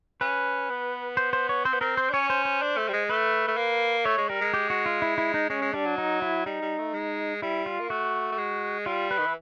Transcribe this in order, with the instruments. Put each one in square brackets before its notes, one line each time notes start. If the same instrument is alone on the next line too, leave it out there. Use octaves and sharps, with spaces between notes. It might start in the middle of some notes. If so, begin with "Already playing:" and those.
[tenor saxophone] C#4 [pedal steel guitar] B4
[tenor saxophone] B3
[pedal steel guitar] C5
C5
C#5
[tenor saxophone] C4 [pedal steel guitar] C5
[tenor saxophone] B3
[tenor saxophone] C4 [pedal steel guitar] A#4
[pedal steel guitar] C5
[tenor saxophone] D4
[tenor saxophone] C#4 [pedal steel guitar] C#5
[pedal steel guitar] C5
C5
[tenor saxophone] D4
A3
G3
G#3
[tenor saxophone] A3 [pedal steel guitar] B4
[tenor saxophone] A3
A#3
[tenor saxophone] A3 [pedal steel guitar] C#5
[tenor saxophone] G#3
[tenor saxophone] G3 [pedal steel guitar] A#4
[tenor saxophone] G#3
[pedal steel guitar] G4
F#4
F4
E4
E4
D#4
[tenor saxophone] G#3 [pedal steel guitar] C#4
[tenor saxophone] G#3
[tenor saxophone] G3 [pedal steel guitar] D4
[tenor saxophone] F#3
[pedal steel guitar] D#4
E4
[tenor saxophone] G3 [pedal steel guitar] D#4
[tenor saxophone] G3
A3
G#3
[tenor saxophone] G3 [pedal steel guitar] E4
[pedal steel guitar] F4
[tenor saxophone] A#3
[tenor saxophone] A3 [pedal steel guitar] F#4
[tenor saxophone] A3
G#3
[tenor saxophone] G3 [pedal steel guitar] F4
[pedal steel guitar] B4
[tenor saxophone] D#3
E3